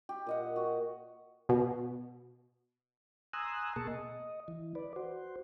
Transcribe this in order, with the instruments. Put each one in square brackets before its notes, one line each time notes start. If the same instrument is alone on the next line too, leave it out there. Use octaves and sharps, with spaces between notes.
[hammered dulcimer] G4
A#2 D#5 F#5
F#4
[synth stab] B2
[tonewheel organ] G#5 A#5 C6 D#6 E6 F#6
B2 A#3 G#4 A5 C#6
D#5
E3
B4 D5
F#4 C5